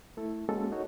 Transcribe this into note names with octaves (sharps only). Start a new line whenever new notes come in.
A3 E4 A4
G#3 A#3 C#4 F#4 A4
D#4 F#4 C#5